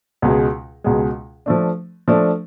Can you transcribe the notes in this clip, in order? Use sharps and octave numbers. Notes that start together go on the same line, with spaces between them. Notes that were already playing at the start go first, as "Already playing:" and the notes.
C#2 B2 G#3
C#2 B2 G#3
F3 A3 D4
F3 A3 D4